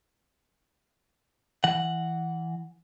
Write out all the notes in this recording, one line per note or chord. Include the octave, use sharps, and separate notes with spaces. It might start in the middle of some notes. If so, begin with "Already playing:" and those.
E3 F#5